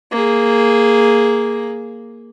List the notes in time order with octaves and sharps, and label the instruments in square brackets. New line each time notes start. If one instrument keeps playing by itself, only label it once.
[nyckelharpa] A#3 G#4